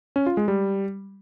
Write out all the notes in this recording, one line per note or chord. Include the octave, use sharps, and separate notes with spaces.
C#4
F4
G#3
G3